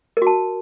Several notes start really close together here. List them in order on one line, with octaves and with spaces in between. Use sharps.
A#4 F#4 A5